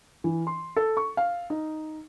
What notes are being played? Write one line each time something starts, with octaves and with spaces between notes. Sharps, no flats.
E3
C6
A4
C#6
F5
D#4